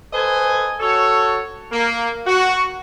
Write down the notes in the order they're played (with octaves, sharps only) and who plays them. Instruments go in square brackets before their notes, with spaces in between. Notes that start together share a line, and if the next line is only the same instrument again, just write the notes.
[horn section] A4 B4 C5 D#5 G#5
F#4 A4 C#5
A#3
F#4